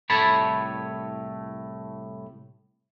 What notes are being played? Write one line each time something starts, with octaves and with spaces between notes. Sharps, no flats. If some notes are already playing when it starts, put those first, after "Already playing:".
C2 A2 A3 C#5 A5 B5